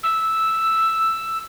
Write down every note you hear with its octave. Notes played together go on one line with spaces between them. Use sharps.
E6